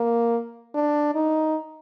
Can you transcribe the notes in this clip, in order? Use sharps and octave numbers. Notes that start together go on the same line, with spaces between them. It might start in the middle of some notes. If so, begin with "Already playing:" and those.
Already playing: A#3
D4
D#4